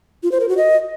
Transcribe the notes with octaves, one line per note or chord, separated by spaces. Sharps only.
F4
C5
A#4
F#4
D#5